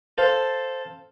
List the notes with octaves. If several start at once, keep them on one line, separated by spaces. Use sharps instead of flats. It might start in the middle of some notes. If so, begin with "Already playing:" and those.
A4 C5 F5